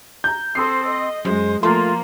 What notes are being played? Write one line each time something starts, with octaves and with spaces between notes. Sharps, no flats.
A#5 G6
C4 A4 C5 C6 D#6 C7
D#5
F#2 G#3 C5
F3 A3 A#3 F4 A#5 C6